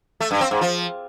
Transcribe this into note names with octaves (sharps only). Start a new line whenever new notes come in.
A3
G2
C4
G#2
F3